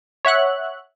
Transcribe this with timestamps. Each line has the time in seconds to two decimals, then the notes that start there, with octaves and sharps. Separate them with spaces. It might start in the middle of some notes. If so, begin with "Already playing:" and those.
0.25 C#5 E5 F#5 F#6